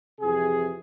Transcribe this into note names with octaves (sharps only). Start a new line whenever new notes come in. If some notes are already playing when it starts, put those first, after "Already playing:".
F2 C3 E3 G#4